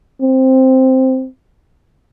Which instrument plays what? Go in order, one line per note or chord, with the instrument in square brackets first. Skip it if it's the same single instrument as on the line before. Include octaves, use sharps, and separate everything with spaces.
[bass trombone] C4